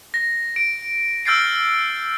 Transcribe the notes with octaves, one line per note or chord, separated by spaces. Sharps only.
A#6
D7
E6 F6 G6 A6 C7 D7